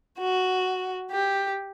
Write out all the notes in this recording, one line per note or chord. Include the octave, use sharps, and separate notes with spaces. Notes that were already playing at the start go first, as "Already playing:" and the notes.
F#4
G4